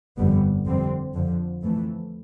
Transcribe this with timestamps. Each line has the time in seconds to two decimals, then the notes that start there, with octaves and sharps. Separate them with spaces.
0.18 G1 F2 D3 G3 B3
0.66 F2 D3 G3 C4
1.14 F2 D3 F3
1.62 F2 E3 A3